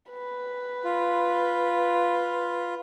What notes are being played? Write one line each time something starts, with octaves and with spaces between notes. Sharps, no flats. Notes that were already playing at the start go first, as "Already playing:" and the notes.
B4
F4